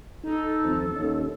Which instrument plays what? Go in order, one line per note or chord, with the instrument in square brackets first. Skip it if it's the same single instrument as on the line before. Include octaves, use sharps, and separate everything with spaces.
[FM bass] D#4 [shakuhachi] A4
[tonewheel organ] D#2 F3 C4
[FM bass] D#2 [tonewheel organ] C#4 D#4